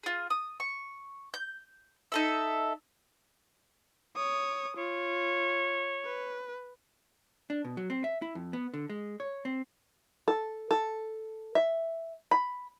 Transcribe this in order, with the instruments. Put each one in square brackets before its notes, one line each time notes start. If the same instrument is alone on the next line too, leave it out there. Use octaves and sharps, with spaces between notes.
[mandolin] F4 G#4
D#6
C#6
G6
D#4 A4 E5
[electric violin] C#5 D#6
[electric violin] F4 [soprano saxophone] C#5
[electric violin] B4
[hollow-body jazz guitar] D4
B2
F#3
C4
E5
E4
F2
B3
D3
G#3
C#5
C4
[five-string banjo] A4
A4
E5
B5